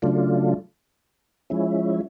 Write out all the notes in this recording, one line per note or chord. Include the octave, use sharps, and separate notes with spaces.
C#3 F#3 A3 D4 F4
F3 G#3 C#4 E4